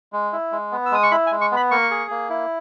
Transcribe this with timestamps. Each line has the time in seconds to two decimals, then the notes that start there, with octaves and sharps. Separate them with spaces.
0.13 G#3
0.33 E4
0.52 G#3
0.72 B3
0.86 E6
0.92 G#3 D#6
1.03 C#6
1.11 E4 B5
1.27 G#5
1.31 G#3
1.41 C#6
1.52 B3 B5
1.71 A#3 C#6
1.91 G#4
2.11 A#3
2.30 E4